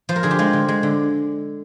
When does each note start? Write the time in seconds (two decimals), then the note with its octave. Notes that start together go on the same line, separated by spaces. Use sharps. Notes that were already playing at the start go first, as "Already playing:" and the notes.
0.09 F3 C5
0.16 A#4
0.23 D3 G#4
0.31 G4
0.39 G#3 F4
0.53 D3
0.68 G#3
0.83 D3